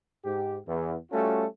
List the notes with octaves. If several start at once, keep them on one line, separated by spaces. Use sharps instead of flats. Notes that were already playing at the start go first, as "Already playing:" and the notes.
G#2 G4
E2
G3 A3 C#4 F4 F#4 A4